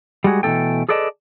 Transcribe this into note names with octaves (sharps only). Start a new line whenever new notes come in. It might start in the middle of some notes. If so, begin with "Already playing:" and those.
G3 G#3 F#4 G#4
B2 E3 A3 B3 A4 G5
G#4 A4 B4 D5 D#5 A5